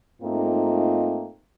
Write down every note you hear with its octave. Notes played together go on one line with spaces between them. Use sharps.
G#2 A3 A#3 C4 D#4 F4